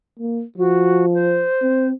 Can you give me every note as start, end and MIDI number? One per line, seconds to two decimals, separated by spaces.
0.20 0.43 58
0.58 1.45 53
0.58 1.05 66
1.14 1.88 72
1.62 1.93 60